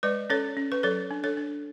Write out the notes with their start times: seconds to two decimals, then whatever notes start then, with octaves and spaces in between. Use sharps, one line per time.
0.03 G#3 B4 D5
0.30 C#4 A4 C#5
0.57 C#4
0.72 B4
0.83 F#3 A4 C#5
1.11 D4
1.24 A4 C#5
1.37 D4